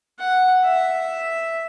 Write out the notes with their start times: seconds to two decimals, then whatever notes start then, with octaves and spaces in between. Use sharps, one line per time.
0.19 F#5
0.64 E5